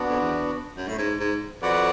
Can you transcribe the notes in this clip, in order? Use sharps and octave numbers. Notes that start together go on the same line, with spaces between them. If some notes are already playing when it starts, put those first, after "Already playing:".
Already playing: B3 D4 F#4
F2
E2
F#2
A2
G#2
G#2
F2 F#4 B4 D5 F#5